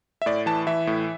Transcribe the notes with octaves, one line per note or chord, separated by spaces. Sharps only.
E5
A2 D5
E3 A5
E3 E5
A2